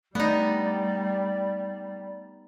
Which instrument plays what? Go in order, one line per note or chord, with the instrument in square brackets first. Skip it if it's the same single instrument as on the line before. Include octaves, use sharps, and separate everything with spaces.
[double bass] G3 [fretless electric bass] A3 [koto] B3 D#4 [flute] D5